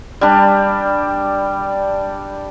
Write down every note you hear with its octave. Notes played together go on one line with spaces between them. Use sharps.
G3 D4